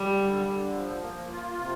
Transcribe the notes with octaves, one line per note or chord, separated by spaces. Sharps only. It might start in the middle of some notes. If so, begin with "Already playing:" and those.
Already playing: G3
D3
D3
F3
A#3
F4
C3